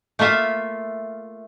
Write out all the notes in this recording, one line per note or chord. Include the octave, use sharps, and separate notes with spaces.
A3 A#3 F4 E5